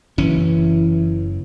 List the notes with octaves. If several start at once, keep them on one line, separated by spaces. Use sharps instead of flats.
F#1 E3 C#4